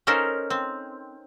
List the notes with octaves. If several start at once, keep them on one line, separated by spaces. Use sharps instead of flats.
C#4 D#4 A4 A#4 C5
C4